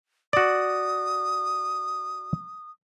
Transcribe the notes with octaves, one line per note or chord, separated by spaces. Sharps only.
F#4 D5 D#6